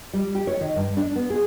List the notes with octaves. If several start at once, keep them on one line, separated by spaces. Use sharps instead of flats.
G3
G4
C#5
D#3
G2
D4
B3
G#4